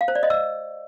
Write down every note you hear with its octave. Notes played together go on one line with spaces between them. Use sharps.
F5
C5
D5
D#5
E6